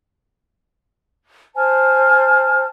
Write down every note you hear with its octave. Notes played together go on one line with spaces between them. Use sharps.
C5 G#5 A5 F6